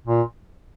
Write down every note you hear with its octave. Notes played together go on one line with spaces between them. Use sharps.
A#2